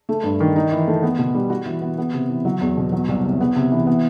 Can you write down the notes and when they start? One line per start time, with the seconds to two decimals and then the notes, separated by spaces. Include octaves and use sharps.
0.09 A3
0.23 G2
0.40 D#3
0.56 D#4
0.72 E3
0.87 A3
1.03 B3
1.19 B2
1.35 G3
1.50 F#4
1.66 E3
1.81 B3
1.98 B3
2.13 C3
2.29 E3
2.45 F#3
2.61 E2
2.77 B2
2.92 F#3
3.08 C2
3.25 C3
3.41 B3
3.56 C3
3.72 E3
3.87 B3